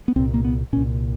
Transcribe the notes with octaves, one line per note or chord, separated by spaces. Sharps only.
B3
C2 A#2 C4
A#3
B3
C2 A#2 C#4